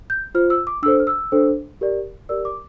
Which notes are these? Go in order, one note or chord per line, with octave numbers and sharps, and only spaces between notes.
G6
F4 C5 F6
E6
D6
D4 A4 C5 E6
F6
E6
D4 A4 C5
G4 A#4 D5
G4 A#4 D5 E6
D6